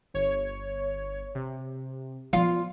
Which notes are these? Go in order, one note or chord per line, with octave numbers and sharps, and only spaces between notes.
G1 C#5
C3
F3 B3 F4